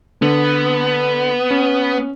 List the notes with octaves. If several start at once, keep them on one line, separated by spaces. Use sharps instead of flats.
D3 B3
C#4